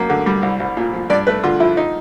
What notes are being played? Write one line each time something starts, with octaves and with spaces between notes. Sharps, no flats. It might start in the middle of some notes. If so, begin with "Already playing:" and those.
Already playing: F#2 F#3 A#3
D3
G3
C2
C2
A#2
F3
G2 D5
A3 B4
D3 F4
F3 E4
D#4